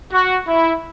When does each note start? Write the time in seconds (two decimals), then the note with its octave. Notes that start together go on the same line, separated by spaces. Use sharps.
0.13 F#4
0.48 E4